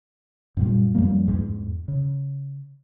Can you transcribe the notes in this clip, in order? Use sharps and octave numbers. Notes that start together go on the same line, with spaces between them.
F#2 A#2 G3
F#2 F3 G3 A#3
E2 G#2
C#3